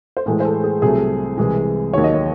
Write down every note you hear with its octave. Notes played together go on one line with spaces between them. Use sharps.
C5
A2 E3 G#3 A4
C5
A4
G#4
C2 C3 F#3 A3 G#4
C2 C3 E3 G#3
D#2 D#3 F#3 C#5
D#5
C#5